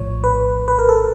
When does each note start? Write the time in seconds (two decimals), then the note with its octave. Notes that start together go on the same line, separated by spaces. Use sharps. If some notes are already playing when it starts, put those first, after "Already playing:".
Already playing: A#1 A2 F3 C#5
0.24 B4
0.68 B4
0.79 A#4
0.89 A4